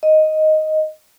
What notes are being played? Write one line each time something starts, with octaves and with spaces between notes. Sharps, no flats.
D#5